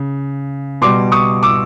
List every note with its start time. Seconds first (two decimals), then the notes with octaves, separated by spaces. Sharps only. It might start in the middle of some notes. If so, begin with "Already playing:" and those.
Already playing: C#3
0.82 B2 G3 C6 D6
1.12 C#6 D#6
1.43 D6 E6